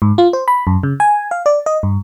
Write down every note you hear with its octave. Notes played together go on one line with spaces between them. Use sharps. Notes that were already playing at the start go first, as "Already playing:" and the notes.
G#2
F4
C5
B5
F#2
C#3
G#5
F5
D5
D#5
G2